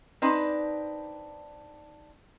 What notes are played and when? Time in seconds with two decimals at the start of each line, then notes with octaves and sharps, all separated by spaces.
0.22 C4 D4 D#4 B4